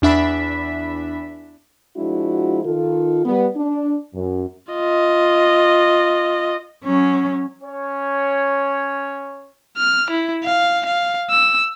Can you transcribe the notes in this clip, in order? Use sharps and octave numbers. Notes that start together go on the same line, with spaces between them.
E2 D4 E5 B5 B6
F3 G#3 D4 E4 F#4
D#3 F4 A4
G3 B3
D4
F#2
F4 D#5
F#3 C#4
C#4 C#5
F6
E4
F5
F5
E6